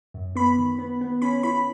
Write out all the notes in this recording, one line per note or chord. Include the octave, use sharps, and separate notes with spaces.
F#2
B3 B5
D#3
B3
B3
C#4 B5
E4 B5